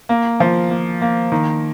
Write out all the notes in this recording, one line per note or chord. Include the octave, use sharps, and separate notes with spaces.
A#3
F3
A#3
A#3
D#3